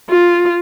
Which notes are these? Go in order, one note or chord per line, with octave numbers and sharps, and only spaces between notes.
F4